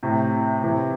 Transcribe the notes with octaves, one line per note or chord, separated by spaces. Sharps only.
A2 C3
C3 E3